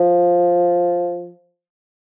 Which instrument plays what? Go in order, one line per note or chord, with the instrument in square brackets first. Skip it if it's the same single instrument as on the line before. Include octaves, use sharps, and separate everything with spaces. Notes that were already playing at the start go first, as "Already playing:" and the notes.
Already playing: [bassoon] F3